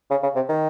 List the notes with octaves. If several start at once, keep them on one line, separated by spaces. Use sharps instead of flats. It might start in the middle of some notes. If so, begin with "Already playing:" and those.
C#3
C#3
C3
D#3